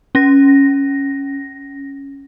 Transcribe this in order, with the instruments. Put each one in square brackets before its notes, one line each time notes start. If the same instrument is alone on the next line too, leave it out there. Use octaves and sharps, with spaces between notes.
[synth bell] C#4 A#6